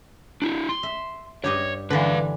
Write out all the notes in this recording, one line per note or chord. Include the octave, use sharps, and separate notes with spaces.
D4 E4
C6
E5
G2 G4 C#5 D#5
D3 E3 B4 F5